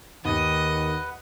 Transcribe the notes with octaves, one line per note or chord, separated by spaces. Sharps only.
D#2 D#3 B4 D#5 F#5